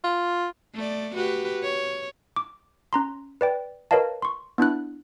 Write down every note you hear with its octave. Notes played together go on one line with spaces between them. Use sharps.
F4
A3 D5
F#4 G4 B4
C#5
D6
C#4 A#5 C6
B4 D5 G5
A#4 B4 C#5 D#5 F5 A5
C6 C#6
B3 D4 E4 F#6